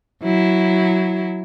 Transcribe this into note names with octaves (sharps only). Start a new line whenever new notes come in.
F#3 E4